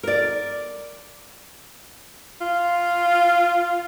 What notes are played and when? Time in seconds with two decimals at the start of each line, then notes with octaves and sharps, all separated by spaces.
0.03 A#4 D5
2.41 F4